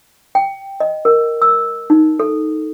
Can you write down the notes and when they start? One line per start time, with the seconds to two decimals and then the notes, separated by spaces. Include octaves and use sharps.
0.35 G5
0.80 D#5
1.05 A#4
1.42 E6
1.90 D#4
2.20 A4